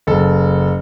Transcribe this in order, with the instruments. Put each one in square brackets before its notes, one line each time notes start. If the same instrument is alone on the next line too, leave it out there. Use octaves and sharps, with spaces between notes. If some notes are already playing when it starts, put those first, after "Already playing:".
[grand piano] F#1 A4